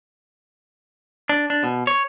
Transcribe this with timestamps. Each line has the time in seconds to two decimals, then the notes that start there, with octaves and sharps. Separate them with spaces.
1.29 D4
1.50 D4
1.64 B2
1.87 C#5